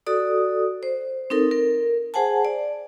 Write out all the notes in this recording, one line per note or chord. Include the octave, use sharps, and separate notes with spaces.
F#4 A4 D5 D#6
C5
C4 D#4 A4 A#4
A#4
G#4 C5 F#5 G#5 A5
D5